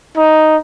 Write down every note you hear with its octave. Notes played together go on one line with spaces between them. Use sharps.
D#4